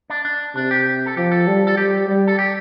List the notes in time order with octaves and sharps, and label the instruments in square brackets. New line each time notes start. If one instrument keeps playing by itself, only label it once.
[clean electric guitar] D4
D4
[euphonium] C3 [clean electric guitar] D4
[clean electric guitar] G4
A4
[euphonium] F3 [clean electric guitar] G4
[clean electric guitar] A4
[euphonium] G3
[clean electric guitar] A4
[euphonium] G3 [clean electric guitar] G4
[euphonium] G3
[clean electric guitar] A4
G4